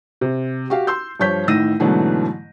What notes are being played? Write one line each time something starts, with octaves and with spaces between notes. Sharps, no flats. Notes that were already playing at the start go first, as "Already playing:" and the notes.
C3
F#4 G4 F5
C6 E6 G6
G2 F3 C#5 G6 B6
A1 A2 D#3 E6 A#6 D#7
G#2 B2 D3 E3 F#3 A3